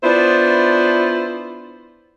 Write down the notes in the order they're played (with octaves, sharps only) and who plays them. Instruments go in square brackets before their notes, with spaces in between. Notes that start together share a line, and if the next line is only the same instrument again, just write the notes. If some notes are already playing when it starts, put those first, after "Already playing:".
[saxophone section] B3 D4 E4 F4 C5